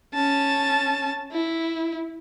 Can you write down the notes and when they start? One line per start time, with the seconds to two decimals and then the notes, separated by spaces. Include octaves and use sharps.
0.14 C#4 A5
1.32 E4